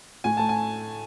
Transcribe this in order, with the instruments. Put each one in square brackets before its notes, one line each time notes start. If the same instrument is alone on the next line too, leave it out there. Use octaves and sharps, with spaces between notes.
[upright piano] A2 G#5
A3 A5
G#5